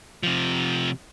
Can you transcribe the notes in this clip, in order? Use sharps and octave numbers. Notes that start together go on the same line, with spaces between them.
C3 F3